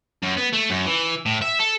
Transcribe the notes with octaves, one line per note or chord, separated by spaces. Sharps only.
F#2
B3
A3
F#2
E3
A2
E5
A4